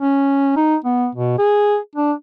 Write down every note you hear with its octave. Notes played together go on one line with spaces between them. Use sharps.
C#4
D#4
B3
B2
G#4
D4